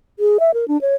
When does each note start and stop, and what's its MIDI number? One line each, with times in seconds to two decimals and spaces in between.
0.19 0.38 68
0.40 0.51 76
0.54 0.65 70
0.68 0.80 62
0.81 0.95 73